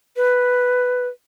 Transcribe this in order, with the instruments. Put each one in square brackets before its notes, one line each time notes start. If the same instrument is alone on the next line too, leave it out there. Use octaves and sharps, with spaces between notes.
[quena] B4